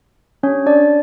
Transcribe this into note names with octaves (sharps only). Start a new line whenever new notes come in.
C#4 D4 G4 C#5
D4 D5